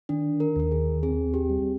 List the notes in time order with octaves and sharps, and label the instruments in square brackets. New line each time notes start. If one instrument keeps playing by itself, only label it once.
[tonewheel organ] D#3 [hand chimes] D4
[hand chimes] A#4
[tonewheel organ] D#2 [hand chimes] A#4
[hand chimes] G#4
[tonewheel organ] C4 [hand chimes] G#4
[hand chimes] G4
[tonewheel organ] G3